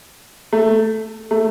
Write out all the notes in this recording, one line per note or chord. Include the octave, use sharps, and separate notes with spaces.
A3
A3